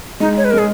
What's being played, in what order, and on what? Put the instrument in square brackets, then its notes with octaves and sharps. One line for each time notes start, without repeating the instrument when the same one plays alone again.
[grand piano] G#3 [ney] D#4
[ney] C#5
B4
A#4
[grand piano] G#3 [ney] G#4